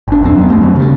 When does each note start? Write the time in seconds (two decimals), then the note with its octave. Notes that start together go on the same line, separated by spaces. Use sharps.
0.08 G#1 D4
0.23 E1 F2 C4
0.36 F#3 A#3 B3
0.49 F#2 A3 C4
0.61 D#3 F#3
0.75 G2 C#3